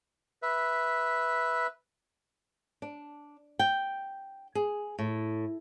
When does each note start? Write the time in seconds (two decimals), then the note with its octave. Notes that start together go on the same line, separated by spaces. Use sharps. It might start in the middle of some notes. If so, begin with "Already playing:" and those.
0.42 B4 E5
2.82 D4
3.59 G5
4.55 G#4
4.99 A2